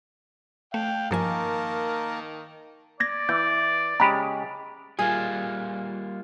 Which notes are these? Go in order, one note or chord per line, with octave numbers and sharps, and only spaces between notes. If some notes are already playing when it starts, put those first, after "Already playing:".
A3 F5 G5
G2 D#3 F3 A#3 A#4 G#5 A5
D5 G#6 A#6
E3 G6
C#3 G#3 G4 A#5 B5
G3 A#3 F4 G#4